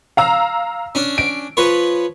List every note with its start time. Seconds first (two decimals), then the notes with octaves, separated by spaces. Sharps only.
0.17 F5 A#5 E6
0.95 C#4 D4
1.18 D7
1.57 F3 B4 C#5